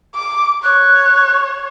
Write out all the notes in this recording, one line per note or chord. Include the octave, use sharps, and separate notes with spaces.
D6
C#5 F#6